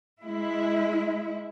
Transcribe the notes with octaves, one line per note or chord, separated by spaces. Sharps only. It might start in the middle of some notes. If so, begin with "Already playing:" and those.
G#3 E4